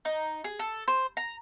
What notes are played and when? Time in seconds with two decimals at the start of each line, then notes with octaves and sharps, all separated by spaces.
0.05 D#4
0.44 G#4
0.59 A4
0.88 C5
1.17 A#5